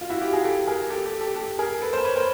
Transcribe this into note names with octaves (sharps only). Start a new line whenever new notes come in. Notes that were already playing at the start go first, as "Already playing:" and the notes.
F4
E4 F#4
F4 G4
F#4 G#4
G4 A4
G#4 A#4
G4 A4
G4 A4
G4 A4
G4 A4
G#4 A#4
A4 B4
A#4 C5
B4 C#5
A#4 C5